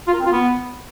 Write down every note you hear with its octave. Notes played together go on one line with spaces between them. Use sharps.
F4
A#4
C4
F4
B3